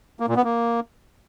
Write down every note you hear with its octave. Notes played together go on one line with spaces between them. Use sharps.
A#3
A#2
B3
A#3